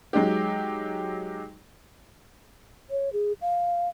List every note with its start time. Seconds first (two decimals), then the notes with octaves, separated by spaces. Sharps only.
0.13 F#3 G#3 D#4 G4
2.90 C#5
3.13 G#4
3.41 F5